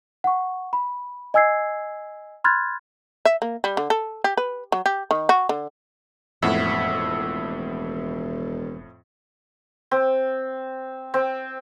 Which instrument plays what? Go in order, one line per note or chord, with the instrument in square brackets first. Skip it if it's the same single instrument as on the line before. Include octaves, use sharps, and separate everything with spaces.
[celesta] F#5 C#6
B5
D#5 G#5 E6 G#6 C7
B5 C6 F6 F#6 G#6 A6
[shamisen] E5
A#3
G3
D3
A4
G4
B4
F#3
G4
D#3
F#4
D3
[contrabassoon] E1 [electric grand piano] F2 A2 F#5 [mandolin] E5
[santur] C4
C4